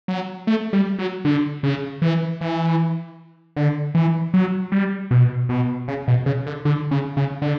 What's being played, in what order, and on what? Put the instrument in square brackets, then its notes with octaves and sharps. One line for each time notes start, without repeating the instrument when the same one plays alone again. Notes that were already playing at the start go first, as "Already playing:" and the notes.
[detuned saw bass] F#3
A3
G3
F#3
D3
C#3
E3
E3
D3
E3
F#3
G3
B2
B2
C#3
B2
C#3
D3
D3
C#3
C#3
D3